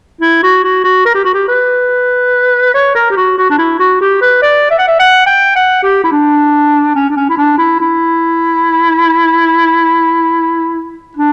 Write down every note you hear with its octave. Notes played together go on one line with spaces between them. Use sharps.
E4
F#4
F#4
F#4
A#4
G4
F#4
G4
B4
C#5
A#4
G4
F#4
F#4
D4
E4
F#4
G4
B4
D5
E5
F#5
E5
F#5
G5
F#5
G4
E4
D4
C#4
D4
C#4
E4
D4
E4
E4
D4